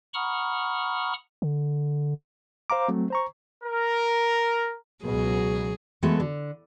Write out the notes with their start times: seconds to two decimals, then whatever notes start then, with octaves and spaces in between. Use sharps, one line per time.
0.14 F#5 A#5 B5 C#6 D#6 F6
1.42 D3
2.70 C5 F5 A#5 D6
2.88 F#3 A3 C4
3.10 C5 A#5 C#6
3.64 A#4
5.04 C#2 B2 F#3 G#4
6.02 E3 G#3 A3 B3 F#4 A4
6.20 D3